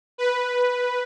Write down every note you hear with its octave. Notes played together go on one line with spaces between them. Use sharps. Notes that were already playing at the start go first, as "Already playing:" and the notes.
B4